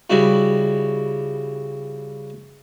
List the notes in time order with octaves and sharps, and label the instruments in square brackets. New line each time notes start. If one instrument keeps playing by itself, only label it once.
[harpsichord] C#3 G3 E4 F#4